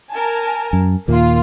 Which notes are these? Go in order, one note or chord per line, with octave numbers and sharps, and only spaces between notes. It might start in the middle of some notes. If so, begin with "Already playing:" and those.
A#4 G#5 A5
F#2
D#2 A#2 A#3 F4